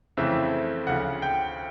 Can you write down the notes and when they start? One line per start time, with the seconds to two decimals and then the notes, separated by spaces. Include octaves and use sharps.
0.17 F2 C#3 E3 A3 C4 E5
0.87 D2 C#3 F3 F#5
1.22 G5